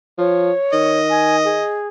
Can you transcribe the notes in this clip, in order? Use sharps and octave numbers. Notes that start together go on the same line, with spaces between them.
F3 C#5
D#3 D#5
G#5
G#4